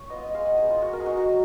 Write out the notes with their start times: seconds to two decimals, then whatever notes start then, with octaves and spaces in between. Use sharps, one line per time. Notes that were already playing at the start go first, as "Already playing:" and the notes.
Already playing: C#5
0.09 B3 F4 D#5
0.26 D#5
0.34 G#3 F5
0.46 F#5
0.58 B3 D#4 G#4
0.70 F4
0.82 A#3 F#4
0.93 A#4
1.00 G#4
1.06 D#4 F#4
1.17 F#4
1.29 F#3